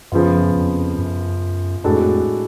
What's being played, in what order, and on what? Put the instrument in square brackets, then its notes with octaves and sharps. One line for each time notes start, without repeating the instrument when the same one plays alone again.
[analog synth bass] F#2 [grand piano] C#3 F3 B3 F4
[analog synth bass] F2
F#2
[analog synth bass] F2 [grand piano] A2 G#3 D4 F#4 A4